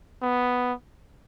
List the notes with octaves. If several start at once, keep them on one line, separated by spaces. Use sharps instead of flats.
B3